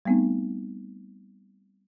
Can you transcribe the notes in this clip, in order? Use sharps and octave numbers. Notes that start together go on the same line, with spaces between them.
G3 A3 B3 C4 D#4